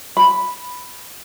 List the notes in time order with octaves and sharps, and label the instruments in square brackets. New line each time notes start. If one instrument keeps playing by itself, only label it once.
[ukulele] B5